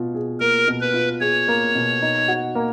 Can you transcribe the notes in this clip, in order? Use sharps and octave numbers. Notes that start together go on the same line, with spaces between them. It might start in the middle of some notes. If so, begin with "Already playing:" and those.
Already playing: B2 F4
G#4
A#3 A#4
B2
B4
F4
G#4 C#5
A#3
B2
D#4
F#4
A#3